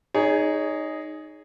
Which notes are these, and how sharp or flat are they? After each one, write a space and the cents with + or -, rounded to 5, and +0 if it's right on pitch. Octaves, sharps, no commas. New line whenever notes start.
D#4 +0 G#4 +0 C#5 +30